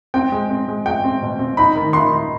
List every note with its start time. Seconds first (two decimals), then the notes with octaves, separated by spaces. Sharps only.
0.14 C4 G5
0.32 G#3
0.50 C4
0.68 G#3
0.86 G#3 G5
1.04 C4
1.22 B2
1.39 C4
1.57 D#4 B5
1.75 D#3
1.93 D#3 C6
2.11 D#4